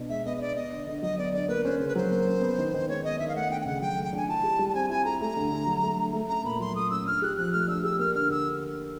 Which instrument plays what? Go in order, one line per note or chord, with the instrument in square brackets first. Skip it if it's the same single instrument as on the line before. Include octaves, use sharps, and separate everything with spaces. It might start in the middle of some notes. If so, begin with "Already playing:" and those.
Already playing: [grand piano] B2 B3 D4
[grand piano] G#3 [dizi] E5
[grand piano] B3 [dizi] D#5
[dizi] D#5
[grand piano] D4 [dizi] D5
[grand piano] B3 [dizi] D#5
[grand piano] D3
D3
[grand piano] F#3 [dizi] D#5
[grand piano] B3 [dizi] D5
[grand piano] D3 [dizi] D5
[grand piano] A#3 [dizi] B4
[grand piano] C#4 [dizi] C5
[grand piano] C#3 [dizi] C5
[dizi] B4
[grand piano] F#3 [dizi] C5
[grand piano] A#3
C#4
B3
D#3
D#3
[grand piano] G#3 [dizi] C#5
[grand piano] B3 [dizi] D#5
[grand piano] D#3 [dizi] E5
[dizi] F5
[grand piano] A3 [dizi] F#5
[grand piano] D4 [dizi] G5
[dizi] G5
[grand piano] C#3 [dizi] F#5
[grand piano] F#3 [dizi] G5
[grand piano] A3
[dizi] G5
[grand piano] D4 [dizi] G#5
[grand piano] E4 [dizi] A5
[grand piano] G4
G3
[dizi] A5
[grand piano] C4 [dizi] G#5
[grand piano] E4 [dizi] G#5
[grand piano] G4 [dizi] A#5
[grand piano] A3 [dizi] A#5
[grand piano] D3
D3
F#3
A3
D3
A3
[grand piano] C#4 [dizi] A#5
[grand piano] A#2 [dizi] B5
[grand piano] F#3 [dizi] C6
[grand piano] A3 [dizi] D#6
[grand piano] C#4 [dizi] E6
[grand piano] D4 [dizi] F6
[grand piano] G4 [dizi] F#6
[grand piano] F3 [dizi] F#6
[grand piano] A3 [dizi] F6
[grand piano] D4 [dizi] E6
[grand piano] G4 [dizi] E6
[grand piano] A#3 [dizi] F6
[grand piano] D3 [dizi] F6
[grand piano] D3 [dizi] E6